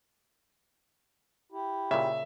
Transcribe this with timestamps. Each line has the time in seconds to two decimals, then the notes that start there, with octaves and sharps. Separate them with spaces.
1.52 E4 G4
1.91 A#2 C#3 E5